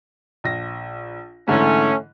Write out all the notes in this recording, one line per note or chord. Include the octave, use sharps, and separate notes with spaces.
A#1 A#6
G#2 D3 E3 A3 C#4